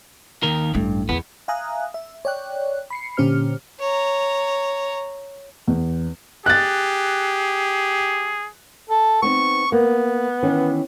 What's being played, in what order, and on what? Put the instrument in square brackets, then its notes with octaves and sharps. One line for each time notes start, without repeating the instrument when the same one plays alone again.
[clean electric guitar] D#2 D#3 A#4
[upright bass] A1 A3 [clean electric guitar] G2
[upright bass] E2 [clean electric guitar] B3
[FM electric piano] E5 F5 G#5 A#5 D#6 F#6
E5
C#5 D5 G5 F#6
B5 C7 C#7
A#2 D3 C#4 G4 C5 F6
[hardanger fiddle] C#5 A#5
[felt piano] E2
[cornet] G4 [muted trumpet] G#4 [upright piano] F#6 A6
[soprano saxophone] A4
[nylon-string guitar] B3 C4 D#4 [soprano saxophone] C#6
[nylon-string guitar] A#3 [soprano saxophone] B3
[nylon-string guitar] D#3 E3 C#4